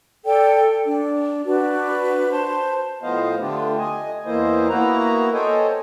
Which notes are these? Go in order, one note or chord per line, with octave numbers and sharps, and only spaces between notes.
A4 D5 G5
D4
D4 F#4 B4
C5 A5
A2 F3 B3 C5 D#5 F5
D3 A3 D4 F4 G4
D#5 G#5
E2 E3 A#3 E4 C5 D#5
A#3 B3 E4 F#4 B4 A#5
A4 C5 C#5 D#5 G5 G#5